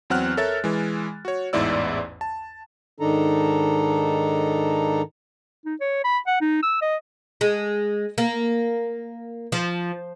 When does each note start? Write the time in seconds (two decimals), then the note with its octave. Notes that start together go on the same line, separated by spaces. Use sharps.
0.10 E2 F#3 C4 F#5 F6 F#6
0.37 A4 A#4 C#5 E5 A6
0.64 E3 G#3
1.25 F#4 C#5
1.53 A1 E2 G#2 E4 D5 E6
2.21 A5
3.00 G#2 D#3 D4 D#4 A4 A#5
5.66 D#4
5.80 C#5
6.04 B5
6.27 F#5
6.41 D#4
6.63 E6
6.81 D#5
7.41 G#3
8.18 A#3
9.52 F3